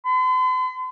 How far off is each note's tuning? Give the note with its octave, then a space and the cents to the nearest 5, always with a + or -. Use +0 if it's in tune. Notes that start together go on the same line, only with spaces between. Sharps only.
C6 -45